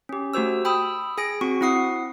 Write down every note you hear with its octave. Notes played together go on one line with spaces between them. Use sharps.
C#4 G4
A3 F#4 G4 C5 E6
G5 B5 D#6 E6
G#4 G#5 A#6 D7
C4 F#4 C#6
C4 E4 F#5 D#6 C7